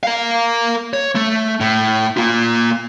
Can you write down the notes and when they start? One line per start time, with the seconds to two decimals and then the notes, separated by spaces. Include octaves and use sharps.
0.03 A#4 F5
0.93 C#5
1.15 A3
1.61 A2
2.17 A#3 F4